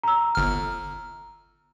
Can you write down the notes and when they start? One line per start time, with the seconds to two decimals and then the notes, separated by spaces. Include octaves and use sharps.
0.03 A#5 E6
0.35 G1 F6